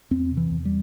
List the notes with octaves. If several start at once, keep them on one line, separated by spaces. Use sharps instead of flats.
E2 C4
C3
E3
E2
G3